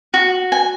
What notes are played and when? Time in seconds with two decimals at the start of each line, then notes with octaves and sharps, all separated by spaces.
0.14 F#4
0.52 G#5